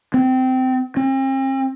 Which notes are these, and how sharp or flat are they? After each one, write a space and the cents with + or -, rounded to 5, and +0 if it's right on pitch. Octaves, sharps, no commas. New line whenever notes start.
C4 -20
C4 +40